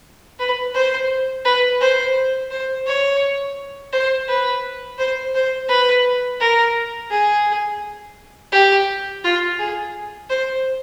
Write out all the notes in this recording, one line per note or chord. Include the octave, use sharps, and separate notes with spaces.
B4
C5
B4
C5
C5
C#5
C5
B4
C5
C5
B4
A#4
G#4
G4
F4
G#4
C5